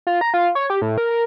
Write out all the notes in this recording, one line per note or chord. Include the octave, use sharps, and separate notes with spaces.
F4
A#5
F4
C#5
G4
A2
A#4
A#4